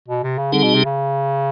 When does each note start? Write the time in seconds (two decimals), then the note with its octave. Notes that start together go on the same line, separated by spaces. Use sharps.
0.08 B2
0.23 C3
0.38 C#3
0.52 D3 G3 C4 D#4 G#4
0.63 B2
0.75 C3
0.85 C#3